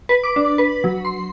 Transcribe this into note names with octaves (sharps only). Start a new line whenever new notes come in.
B4
D6
D4
B4
F#3
C6